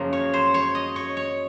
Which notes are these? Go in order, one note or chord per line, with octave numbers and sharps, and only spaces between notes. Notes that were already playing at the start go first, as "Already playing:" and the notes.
Already playing: F#2 C#3 F3 A#3 A#4
C#5
C5
C#5
D#5
C#5
C#5